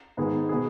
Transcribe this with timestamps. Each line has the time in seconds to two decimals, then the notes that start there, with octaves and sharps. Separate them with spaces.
0.17 G#2 D#3 B3 G#4
0.49 B2 B3 G#4